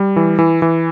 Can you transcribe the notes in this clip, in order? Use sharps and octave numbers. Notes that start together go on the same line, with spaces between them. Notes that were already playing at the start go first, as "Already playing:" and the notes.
Already playing: G3
E3
E3
E3